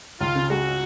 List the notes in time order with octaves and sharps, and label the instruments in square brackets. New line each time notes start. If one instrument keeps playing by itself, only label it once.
[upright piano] C#2 [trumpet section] F4
[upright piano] C#3
[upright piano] G#3 [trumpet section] F#4